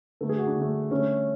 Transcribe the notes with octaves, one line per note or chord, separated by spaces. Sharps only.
D3 A3 A4
G#4
F#4
D4
D3 A3
D3 A3 C#4